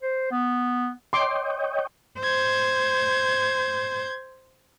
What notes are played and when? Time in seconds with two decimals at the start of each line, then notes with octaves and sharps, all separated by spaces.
0.02 C5
0.31 B3
1.13 C#5 D#5 G5 C6 D6
2.20 C5 G6 G#6